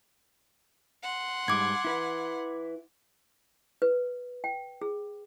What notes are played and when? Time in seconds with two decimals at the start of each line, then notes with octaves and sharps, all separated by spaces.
1.03 F#5 C6
1.48 G#2 G3 D6 G#6
1.85 E4 B4
3.82 B4
4.44 G5
4.82 G#4